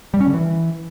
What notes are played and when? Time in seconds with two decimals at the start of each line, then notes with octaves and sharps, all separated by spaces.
0.14 G3
0.20 C#4
0.27 D3
0.34 E3